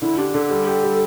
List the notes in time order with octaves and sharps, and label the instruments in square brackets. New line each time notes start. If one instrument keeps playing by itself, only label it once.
[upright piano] D3 [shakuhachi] E4
[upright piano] D4 [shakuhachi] G4
[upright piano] D3 [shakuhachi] A4
[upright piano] G3
G4
G3